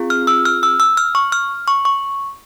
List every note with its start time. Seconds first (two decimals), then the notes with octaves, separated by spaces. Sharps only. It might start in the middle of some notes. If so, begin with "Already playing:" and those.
Already playing: C4 F4 G#4
0.10 F6
0.27 E6
0.45 F6
0.63 E6
0.80 E6
0.97 F6
1.15 C#6
1.32 F6
1.68 C#6
1.85 C#6